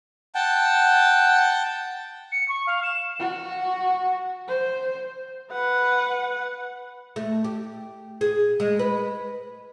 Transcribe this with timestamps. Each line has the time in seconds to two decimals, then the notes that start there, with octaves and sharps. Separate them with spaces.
0.35 F#5 G5 A5
2.32 C#7
2.48 C#6
2.66 F5
2.83 E7
3.19 F#4
4.48 C5
5.51 B4 F#5
7.16 A3
7.44 G4
8.21 G#4
8.60 G#3
8.79 B4